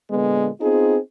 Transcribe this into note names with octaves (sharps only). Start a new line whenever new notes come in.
A#2 D3 G#3 B3
B3 C4 D#4 F4 G#4